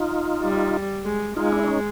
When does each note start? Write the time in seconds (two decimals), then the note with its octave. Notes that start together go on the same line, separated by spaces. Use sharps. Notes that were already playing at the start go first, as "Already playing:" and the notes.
Already playing: D#4 F4
0.42 G3
1.05 G#3
1.36 G#3 D#4 F4
1.52 D4 E4
1.64 D4
1.68 C#4 D#4